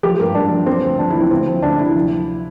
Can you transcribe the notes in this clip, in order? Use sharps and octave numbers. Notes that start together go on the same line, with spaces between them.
F3 G4
G2 A#4
G2 D4
F3
F3 C4
D2
F3 D4
F3 E4
C4
D2 C4
F3
D2 D4
C3 E4
F3
F3